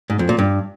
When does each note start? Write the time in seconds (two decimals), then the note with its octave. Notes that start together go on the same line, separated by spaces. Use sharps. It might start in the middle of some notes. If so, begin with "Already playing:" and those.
0.10 G#2
0.19 F2
0.29 A#2
0.39 G2